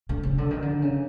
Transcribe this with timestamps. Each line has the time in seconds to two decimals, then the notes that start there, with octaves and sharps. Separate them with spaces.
0.09 D3
0.23 C#3
0.38 D3
0.51 D#3
0.62 D3
0.82 C#3